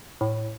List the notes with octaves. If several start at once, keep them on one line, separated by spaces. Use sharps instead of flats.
A2